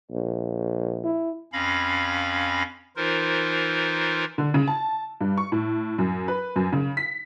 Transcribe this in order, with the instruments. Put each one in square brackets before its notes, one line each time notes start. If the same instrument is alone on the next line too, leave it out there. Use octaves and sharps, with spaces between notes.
[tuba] A#1
[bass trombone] E4
[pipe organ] F2 C#4 F5 B5 A#6
E3 D#4 F4 A#4 C5
[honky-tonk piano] D3
C#3
A5
G2
C#6
A2
F#2
B4
F#2
C#3
B6